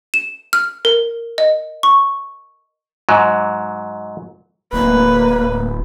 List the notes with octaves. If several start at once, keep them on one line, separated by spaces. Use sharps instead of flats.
E7
F6
A#4
D#5
C#6
G#2 F#3
D1 A#3 B4